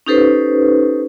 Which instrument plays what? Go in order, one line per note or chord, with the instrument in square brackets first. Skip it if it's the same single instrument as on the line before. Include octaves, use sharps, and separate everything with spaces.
[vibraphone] C#4 D#4 G4 A4 B4 C5